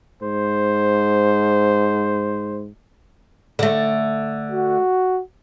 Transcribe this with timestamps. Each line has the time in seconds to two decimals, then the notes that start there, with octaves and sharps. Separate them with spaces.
0.22 G#2 C5
3.59 D3 A3
4.51 F#4